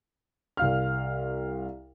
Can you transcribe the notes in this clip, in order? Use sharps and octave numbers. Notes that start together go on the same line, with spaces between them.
C2 F5 F6